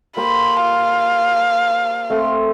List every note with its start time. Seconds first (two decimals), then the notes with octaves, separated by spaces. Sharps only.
0.17 A#3 G4 C5 B5
0.62 F5
2.10 A3 C4